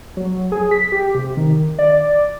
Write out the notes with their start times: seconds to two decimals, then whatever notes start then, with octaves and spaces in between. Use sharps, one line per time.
0.17 F#3
0.52 G#4
0.71 B6
0.92 G4
1.15 C3
1.37 D#3
1.79 D5